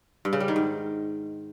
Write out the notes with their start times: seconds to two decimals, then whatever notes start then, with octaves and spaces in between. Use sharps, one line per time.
0.25 G2
0.33 C#3
0.40 G3
0.48 D#3
0.56 G#2